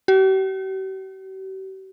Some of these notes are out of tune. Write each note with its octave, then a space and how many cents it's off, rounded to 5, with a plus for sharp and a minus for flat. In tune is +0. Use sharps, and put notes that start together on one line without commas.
G4 -45